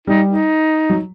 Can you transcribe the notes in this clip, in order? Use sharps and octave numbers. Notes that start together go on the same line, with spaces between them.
G3 D#4
D#4
F#3